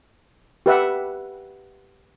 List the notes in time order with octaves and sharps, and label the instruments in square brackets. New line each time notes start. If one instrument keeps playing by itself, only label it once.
[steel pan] G4 B4 E5 F#5